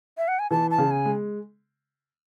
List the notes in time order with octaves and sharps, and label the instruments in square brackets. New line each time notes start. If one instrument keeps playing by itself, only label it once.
[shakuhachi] E5
F#5
G#5
[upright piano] E3 [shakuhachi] A5
[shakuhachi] A5
[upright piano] C#3
[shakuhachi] G#5
[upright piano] G#3